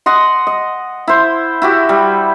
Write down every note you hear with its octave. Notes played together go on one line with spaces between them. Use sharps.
D#5 F#5 C6
D#5
E4 C5
E4 F#4 G4
G3